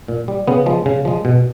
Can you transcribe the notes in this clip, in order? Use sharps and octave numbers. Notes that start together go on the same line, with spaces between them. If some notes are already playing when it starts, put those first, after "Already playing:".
A#2
G3
C#3 B3
F3 G#3
C#3
F3 G#3
B2